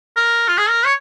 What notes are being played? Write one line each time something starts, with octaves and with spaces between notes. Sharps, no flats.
A#4
F4
G#4
A#4
C#5